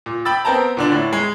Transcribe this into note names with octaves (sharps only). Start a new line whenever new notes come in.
A#2
G5 B5 E6 A6
B3 C4 A#4 G5 A5 A#5
A#2 D3 D4
A2
G#3